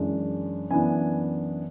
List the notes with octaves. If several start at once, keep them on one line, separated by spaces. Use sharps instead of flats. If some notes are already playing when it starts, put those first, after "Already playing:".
Already playing: F#2 E3 G#3 D4
F#2 E3 B3 D4 G#5